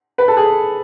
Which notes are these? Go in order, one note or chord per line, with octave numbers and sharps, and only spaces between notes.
B4
A4
G#4